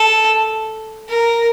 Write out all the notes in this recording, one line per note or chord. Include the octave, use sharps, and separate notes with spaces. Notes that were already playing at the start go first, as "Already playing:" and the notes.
Already playing: A4
A#4